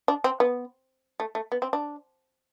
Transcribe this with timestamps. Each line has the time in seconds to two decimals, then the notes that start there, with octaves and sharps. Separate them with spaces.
0.08 D4
0.24 C4
0.40 B3
1.20 A3
1.35 A3
1.52 B3
1.62 C4
1.73 D4